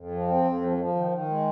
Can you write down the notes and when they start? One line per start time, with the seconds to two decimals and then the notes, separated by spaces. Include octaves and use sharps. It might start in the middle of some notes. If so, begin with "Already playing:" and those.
Already playing: F2
0.11 F3
0.27 C4
0.44 F2
0.61 F3
0.77 F3
0.95 D#3
1.11 D#3
1.28 G#3